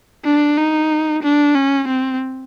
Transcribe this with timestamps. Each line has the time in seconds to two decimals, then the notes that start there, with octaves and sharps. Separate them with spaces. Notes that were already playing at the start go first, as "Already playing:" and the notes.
0.25 D4
0.58 D#4
1.23 D4
1.55 C#4
1.88 C4